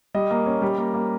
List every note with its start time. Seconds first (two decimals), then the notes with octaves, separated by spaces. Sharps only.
0.14 G3 D#5
0.31 A#3
0.46 C#4
0.62 G3
0.78 A#3
0.94 A#3